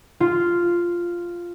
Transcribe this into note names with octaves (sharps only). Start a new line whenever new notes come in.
F4